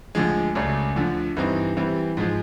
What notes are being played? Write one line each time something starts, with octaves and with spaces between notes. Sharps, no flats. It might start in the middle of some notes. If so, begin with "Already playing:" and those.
D2 D3 F3 G#3
C#2 C#3 F#3 A3 D4
D2 D3 F3
G2 E3 G3 C4 D#4
E3 G3 C4
G#2 F3 G#3